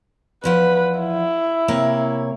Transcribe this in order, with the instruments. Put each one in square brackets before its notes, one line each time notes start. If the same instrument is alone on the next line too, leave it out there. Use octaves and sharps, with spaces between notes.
[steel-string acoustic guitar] E2 F3 F#5 [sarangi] B4
[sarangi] E4
[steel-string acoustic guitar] C3 A#3 C#5